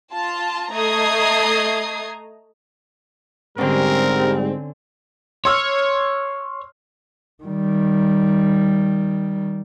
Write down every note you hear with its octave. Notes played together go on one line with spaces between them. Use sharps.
F4 A5
A3 D#5 A#5 D#6 G#6 C7
G#2 D3 G3 C4 C#4 A#4
C#5 C6 E6 F6
D#3 G3